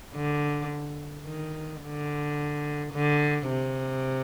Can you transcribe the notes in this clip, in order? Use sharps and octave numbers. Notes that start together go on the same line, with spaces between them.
D3
D#3
D3
D3
C3